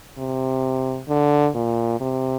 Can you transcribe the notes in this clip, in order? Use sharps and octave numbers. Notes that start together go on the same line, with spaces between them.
C3
D3
A#2
C3